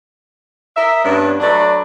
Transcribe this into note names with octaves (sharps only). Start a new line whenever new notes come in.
A#4 D#5 E5
G2 B3 C#4 D4
F#3 A3 D4 B4 D5